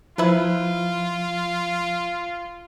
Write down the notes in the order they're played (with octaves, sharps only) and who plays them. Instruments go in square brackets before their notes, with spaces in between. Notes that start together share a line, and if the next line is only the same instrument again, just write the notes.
[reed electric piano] F3 [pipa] E4 B4 [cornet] F4